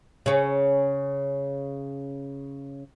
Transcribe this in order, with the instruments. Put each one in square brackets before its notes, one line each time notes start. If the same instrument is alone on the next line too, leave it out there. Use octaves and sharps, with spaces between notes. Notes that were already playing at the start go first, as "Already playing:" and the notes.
[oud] C#3 C#4